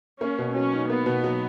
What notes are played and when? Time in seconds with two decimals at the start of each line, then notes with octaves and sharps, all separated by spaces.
0.21 A#3 C#4
0.38 B2
0.55 F#3 C#4
0.72 D#4
0.90 A#3 B3
1.06 B2
1.24 F#3